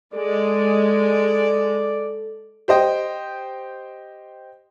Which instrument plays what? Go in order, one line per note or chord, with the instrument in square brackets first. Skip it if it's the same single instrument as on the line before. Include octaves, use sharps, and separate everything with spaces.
[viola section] G#3 [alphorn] A4 [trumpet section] D5
[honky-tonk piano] G4 C5 D#5 G5